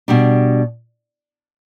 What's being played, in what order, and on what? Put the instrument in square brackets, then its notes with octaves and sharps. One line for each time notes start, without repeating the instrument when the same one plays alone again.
[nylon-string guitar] B2 G3 D4